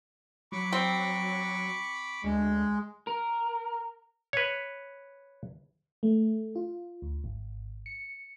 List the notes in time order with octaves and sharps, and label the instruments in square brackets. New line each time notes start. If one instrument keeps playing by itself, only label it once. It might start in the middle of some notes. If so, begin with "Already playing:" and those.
[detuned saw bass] F#3 [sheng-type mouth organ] B5 C#6 D6
[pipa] C4
[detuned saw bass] D2 [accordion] G#3
[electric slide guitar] A#4
[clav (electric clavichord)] B4 C#5
[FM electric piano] A3
F4
D2
G#1
C#7